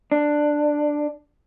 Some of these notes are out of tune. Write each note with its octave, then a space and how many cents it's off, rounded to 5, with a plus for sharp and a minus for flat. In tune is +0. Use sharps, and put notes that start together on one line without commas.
D4 +10